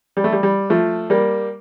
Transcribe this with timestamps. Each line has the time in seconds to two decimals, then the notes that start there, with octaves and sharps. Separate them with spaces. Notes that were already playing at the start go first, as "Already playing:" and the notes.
0.17 G3
0.24 A3
0.32 G3
0.43 G3
0.70 F3 A3
1.10 G3 A#3